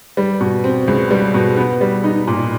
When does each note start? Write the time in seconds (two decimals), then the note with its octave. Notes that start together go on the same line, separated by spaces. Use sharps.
0.17 G3
0.41 B2
0.64 C4
0.88 C#2
1.11 G3
1.34 B2
1.57 B3
1.81 G3
2.04 D#4
2.28 A#2